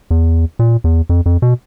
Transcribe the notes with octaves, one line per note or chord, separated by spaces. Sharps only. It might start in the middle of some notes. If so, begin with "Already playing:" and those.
E2
A#2
E2
F2
F2
B2